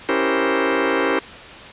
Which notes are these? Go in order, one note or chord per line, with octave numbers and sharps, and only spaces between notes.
C#4 E4 G4 A#4 C5